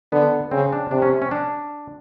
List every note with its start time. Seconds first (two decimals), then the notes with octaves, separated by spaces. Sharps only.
0.12 D3 B3
0.51 C#3 C4
0.73 D4
0.91 C3 D4
1.02 C#4
1.22 C#4
1.31 D4